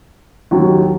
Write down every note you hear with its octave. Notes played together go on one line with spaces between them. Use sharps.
D#2 D#3 F#3